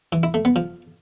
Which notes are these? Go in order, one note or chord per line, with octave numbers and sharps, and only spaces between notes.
E3
E4
A3
B3
F3